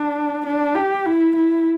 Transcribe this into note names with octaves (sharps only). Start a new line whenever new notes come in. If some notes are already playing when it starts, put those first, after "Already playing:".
Already playing: D4
D4
G4
E4
E4